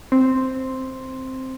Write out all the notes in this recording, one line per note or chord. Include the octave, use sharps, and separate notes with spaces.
C4